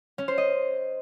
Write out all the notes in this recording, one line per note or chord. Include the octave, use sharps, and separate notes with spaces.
C#4
C5
D#5